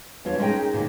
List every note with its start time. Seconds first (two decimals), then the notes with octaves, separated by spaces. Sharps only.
0.25 E2 D4 F4 C#5
0.38 G#3 C#4 D#4 G#4 A#4 G5
0.74 A#2 D#3